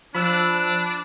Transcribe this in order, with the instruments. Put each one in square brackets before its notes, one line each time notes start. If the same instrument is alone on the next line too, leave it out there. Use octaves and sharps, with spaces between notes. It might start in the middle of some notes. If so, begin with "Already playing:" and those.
[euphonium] F3 [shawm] D4 [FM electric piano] B5 E6 F#6